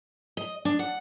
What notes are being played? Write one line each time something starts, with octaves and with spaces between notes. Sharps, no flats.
D#5
D4
F#5